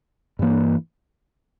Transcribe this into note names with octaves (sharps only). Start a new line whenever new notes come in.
G2 E3 A#3